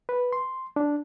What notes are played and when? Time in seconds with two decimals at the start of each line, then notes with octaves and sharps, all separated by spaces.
0.09 B4
0.33 C6
0.76 D4